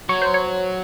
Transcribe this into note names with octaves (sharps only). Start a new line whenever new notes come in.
F#3 C#5
C5
C#5